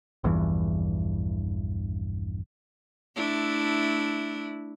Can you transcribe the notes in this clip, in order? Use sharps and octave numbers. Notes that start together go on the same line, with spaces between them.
A#1 E2 G2 E3
A3 D4 E4